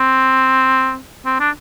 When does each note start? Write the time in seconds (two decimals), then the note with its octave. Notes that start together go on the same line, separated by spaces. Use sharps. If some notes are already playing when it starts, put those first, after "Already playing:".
Already playing: C4
1.26 C4
1.40 D4